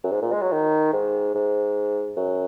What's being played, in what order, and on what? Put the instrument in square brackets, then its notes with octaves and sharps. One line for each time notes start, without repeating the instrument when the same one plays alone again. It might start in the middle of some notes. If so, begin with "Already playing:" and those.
[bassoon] F#2
G#2
A#2
G#3
F#3
D#3
G#2
G#2
F#2